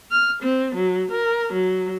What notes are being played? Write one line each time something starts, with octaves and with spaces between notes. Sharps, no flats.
F6
C4
F#3
A#4
F#3